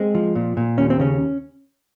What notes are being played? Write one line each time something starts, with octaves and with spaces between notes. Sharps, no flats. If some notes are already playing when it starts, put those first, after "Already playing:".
Already playing: G#3 C4
F3
A#2
A#2
D#2 C#4
C4
C#3 C#4